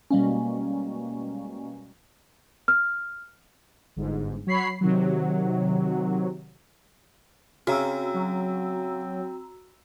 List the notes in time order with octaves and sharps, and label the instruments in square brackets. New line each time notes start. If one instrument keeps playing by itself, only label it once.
[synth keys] B2 G3 G#3 A#3 C#4
[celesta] F6
[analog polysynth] G1 G#2
F#3 C#5 B5 C7
C3 D#3 F#3
[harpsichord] C#3 [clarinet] C4 [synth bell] F#4 A#5 E6
[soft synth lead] F#3